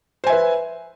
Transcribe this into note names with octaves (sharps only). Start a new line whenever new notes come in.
B4 C5 E5 G#5